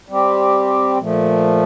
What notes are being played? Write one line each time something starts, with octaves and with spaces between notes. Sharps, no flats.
G3 C4 G4
A#2 F3 A3